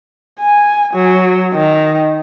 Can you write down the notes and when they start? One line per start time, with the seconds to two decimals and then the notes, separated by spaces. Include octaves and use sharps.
0.41 G#5
0.94 F#3
1.54 D#3